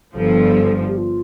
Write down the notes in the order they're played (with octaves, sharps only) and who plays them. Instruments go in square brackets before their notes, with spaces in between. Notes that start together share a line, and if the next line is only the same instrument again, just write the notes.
[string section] G1 G2 F3 [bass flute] A4
[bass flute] G4
F4